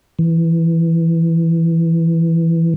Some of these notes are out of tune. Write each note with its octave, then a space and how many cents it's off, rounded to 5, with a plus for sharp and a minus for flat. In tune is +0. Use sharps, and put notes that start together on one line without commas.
E3 +5